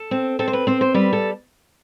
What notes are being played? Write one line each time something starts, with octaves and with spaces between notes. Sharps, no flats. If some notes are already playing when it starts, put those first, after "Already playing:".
Already playing: A4
C4
C4 A4
C5
B4
C4 C5
C5
G3 B4
A4